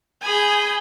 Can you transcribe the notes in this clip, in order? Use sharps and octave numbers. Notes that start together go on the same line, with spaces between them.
G#4 G#5 B5 G6